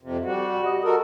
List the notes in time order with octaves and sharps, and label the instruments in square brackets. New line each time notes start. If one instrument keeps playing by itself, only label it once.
[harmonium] F2 C3
[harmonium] G3 [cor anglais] F#4
[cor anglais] D#5
[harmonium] F#4 A#4 [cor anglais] A4